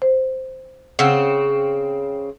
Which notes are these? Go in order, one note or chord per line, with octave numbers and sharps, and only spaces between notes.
C5
C#3 C4 F#5 E6